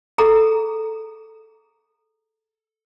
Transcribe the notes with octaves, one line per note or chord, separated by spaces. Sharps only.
G#4 A4 A#5